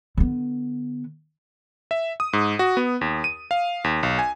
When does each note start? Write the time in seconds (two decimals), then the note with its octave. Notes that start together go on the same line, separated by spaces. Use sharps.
0.17 D3 B3
1.91 E5
2.20 D#6
2.33 G#2
2.59 F#4
2.77 B3
3.01 D#2
3.24 D#7
3.51 F5
3.84 D#2
4.03 B1
4.19 G#5